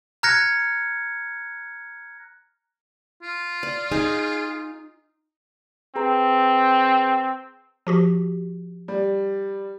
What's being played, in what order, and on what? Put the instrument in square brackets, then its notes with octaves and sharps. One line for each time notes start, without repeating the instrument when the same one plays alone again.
[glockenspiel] A#5 F6 F#6 G#6 A#6 C#7
[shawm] F4
[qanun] D5
[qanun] D#4 [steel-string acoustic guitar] G#4
[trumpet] C4 [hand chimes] G#4 B4 A#5
[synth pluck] F3 F#4 G4
[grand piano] G3